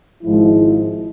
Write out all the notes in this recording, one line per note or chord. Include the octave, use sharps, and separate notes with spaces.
G#1 G#2 F3 G#3 E4